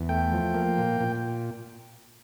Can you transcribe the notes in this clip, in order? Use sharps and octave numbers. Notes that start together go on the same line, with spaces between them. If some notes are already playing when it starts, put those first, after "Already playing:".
Already playing: E2
A3 G5
F3
A#3
A#2
A#2